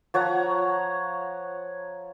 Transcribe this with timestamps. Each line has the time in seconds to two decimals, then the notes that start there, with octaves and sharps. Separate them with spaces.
0.14 F3 C#5 F#5 A#5